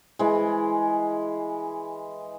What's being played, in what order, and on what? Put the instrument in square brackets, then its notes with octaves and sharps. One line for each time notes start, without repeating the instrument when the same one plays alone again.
[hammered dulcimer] E3 G#3